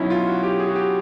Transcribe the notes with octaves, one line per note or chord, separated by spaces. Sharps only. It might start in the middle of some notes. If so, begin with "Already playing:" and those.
Already playing: B2 F#3 B3 C#4 D#4 E4
F4
F#4
G4
G#4
F#4
G4